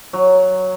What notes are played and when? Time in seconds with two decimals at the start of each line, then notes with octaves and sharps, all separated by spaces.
0.13 F#3